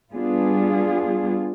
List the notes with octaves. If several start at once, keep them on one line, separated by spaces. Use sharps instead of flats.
G3 B3 D4 F4 G#4